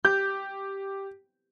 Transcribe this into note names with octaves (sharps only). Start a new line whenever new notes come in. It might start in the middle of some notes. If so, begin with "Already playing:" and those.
G4 G6